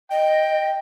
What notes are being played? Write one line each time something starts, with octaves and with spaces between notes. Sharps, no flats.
D#5 G5